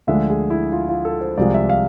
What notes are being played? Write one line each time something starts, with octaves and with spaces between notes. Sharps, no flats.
D2 D3 F3 G#3 E5
G#4
E4
F4
F4
A4
C5
C2 C3 F3 G#3 D5
E5
F5